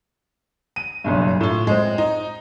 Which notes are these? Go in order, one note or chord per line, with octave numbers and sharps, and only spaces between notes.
D#7
F#1 B1 G2
A2 F4
G#3 C4
D#4